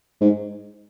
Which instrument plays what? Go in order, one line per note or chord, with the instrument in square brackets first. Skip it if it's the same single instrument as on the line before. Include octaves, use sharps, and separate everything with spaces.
[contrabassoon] G#2